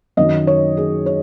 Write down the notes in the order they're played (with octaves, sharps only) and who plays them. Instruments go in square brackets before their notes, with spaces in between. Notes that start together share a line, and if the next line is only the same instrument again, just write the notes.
[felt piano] F#2 D#3 F#3 D#5
C#5
G#4
C#5